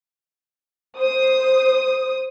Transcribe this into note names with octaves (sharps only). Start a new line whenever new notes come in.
C5 D#6